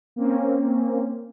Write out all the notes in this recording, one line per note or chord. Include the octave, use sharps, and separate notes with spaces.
A#3 C4 C#4